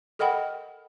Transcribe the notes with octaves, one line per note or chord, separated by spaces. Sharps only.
A4 A#4 D#5 F#5 G5 B5